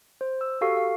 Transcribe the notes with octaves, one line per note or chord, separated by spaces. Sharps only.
C5
E6
F#4 G4 A4 F5 C#6 C7
F5